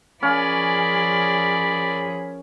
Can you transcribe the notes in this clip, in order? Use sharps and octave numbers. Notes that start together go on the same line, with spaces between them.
F3 C#4 G#4 A#4 D5 B5